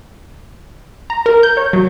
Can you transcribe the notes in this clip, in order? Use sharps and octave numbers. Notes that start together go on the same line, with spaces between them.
A#5
A#4
G6
C#5
F#3